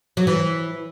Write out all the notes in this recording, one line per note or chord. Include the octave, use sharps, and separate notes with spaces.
F#3
E3